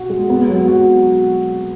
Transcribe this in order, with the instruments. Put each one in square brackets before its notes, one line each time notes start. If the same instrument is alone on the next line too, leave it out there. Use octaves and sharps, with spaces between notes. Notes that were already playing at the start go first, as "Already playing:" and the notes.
Already playing: [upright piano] B2 F#4
G#3
B3
F#3
F#4